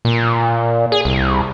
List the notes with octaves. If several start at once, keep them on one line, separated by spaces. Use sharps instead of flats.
A#2
G#4
C2